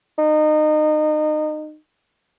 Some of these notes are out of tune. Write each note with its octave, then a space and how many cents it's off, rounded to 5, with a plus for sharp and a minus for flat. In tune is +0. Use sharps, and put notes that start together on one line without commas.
D#4 -25